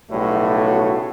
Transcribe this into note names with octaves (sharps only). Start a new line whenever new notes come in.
B1 A2 C#3 G3 A3 F#4